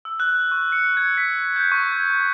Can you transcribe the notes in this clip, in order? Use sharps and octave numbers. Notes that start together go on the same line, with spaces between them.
E6
F#6
C#6
C#7
G#6
B6
G6
C#6
G#6